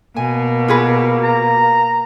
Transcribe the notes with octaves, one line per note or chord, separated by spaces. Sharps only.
B2 A#3 G#5
F4 G#4 B4
A#5